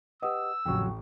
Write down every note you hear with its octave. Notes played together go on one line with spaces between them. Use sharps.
G4 B4 D#5 F#5 D#6 E6
A1 F2 C#3 F#3 G5 C#6